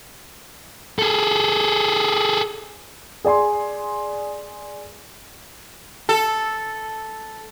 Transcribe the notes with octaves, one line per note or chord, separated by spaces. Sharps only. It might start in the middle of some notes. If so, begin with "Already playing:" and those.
G#4 A4
G#4 D5 G#5 C6
A4